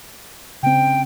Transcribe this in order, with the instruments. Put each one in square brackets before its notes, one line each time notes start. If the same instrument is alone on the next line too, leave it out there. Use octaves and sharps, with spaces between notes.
[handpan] C#3 C4 [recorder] G5